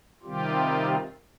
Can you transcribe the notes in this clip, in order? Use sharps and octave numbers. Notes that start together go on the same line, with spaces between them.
C3 D#3 G3 C4 F4 G4